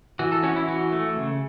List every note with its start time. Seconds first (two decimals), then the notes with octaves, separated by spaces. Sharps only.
0.19 E3 F#4
0.32 A4
0.43 C#4 F#4
0.56 E4
0.68 E3 F#4
0.92 A3
1.17 C#3